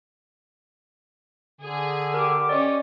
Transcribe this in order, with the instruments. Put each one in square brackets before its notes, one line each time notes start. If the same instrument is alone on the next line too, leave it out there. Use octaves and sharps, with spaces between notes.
[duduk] D3 [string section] G#4
[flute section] G4 D6 [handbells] A#4
[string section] C#4 [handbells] D5 D#5